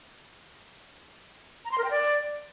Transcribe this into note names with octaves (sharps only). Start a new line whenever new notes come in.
A#5
C6
A#4
G5
D5